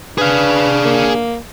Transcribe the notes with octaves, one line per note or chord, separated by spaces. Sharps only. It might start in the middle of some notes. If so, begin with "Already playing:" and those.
D4 G#4 B4 F5
A#3